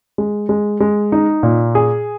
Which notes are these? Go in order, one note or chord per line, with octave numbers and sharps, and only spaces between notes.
G#3
G#3
G#3
D#4
A#2
G#4